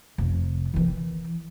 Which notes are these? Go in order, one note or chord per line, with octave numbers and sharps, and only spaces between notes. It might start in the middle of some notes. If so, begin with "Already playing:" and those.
F1
D#3 E3